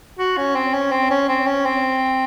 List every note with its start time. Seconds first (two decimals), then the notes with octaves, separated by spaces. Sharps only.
0.19 F#4
0.37 C#4
0.55 C4
0.74 C#4
0.92 C4
1.11 C#4
1.29 C4
1.47 C#4
1.66 C4